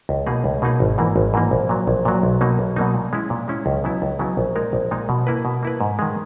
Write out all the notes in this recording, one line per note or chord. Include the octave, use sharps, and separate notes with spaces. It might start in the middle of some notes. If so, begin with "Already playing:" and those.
C#2
B2 A#3 D#4 G#4
C#2
B2 A#3 D#4 G#4
G#1
G#2 E3 A#3
G#1
G#2 E3 A#3
A#1
A#2 F#3
A#1
A#2 F#3
B1
B2 F#3 A#3 D#4
B1
B2 F#3 A#3 D#4
A#2
G#3 C#4 E4
A#2
G#3 C#4 E4
C#2
C#3 F#3 B3 E4
C#2
C#3 F#3 B3 E4
A#1
A#2 G#3 D#4 A#4
A#1
A#2 G#3 D#4 A#4
B2
A#3 E4 B4
B2
A#3 E4 B4
G#2
D#3 G#3